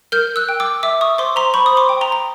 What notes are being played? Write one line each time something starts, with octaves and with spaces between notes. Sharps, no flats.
A#4 F6 G6
E6 F#6
G5
D6 E6
E5 D6 E6
C#6 D#6
C5 C6 D6
A#5 C6
C5 B5 C#6
D#6
C6 D6
G5
A#5 C6
A#5